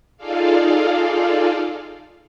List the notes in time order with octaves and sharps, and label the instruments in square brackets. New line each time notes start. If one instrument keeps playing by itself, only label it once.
[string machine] D#4 F4 G#4 A4 D5 F5